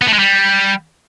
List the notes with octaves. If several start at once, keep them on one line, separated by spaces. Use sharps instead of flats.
B3
A3
G#3
G3